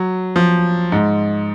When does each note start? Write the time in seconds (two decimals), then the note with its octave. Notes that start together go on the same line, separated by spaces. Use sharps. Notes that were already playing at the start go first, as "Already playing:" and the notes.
Already playing: F#3
0.36 F3
0.92 G#2